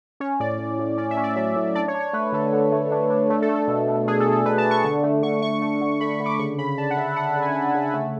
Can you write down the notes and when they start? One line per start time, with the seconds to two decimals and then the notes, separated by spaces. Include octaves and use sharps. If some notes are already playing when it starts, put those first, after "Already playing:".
0.20 C#4 C#5
0.40 A2 D5
0.59 A2
0.79 A2
0.97 C#4 D5
1.11 E5
1.17 C#4
1.24 D5
1.36 F#3 E5
1.55 A2
1.75 D4 D5
1.88 C#5
1.94 D4
2.00 C#5
2.13 A3 B4
2.32 D3 A4
2.53 D3
2.72 A3
2.91 D4
3.10 D4
3.30 A3
3.42 A4
3.49 A3
3.55 A4
3.68 B2
3.87 B2
4.08 D4 G#4
4.20 A4
4.26 A3
4.33 A4
4.45 B2 B4
4.58 A5
4.65 D4
4.71 C#6
4.84 D3 C#6
5.03 A3
5.23 D3 C#6
5.42 A3 C#6
5.62 A3
5.81 D3
6.01 A3 B5
6.20 D3
6.26 D6
6.39 C#3 C#6
6.58 C#3 B5
6.78 D4 A5
6.90 F#5
6.97 C#3 E5
7.16 D4 F#5
7.36 C#3
7.42 G#5
7.55 D4
7.75 C#3
7.94 A3